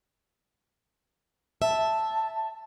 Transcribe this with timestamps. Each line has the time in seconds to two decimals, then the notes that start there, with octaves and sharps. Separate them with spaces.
1.62 E5 A5